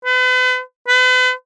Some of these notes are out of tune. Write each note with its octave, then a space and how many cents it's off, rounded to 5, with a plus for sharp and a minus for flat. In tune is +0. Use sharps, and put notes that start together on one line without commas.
B4 +40
B4 +40